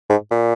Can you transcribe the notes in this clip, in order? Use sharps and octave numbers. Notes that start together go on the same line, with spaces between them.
G#2
A#2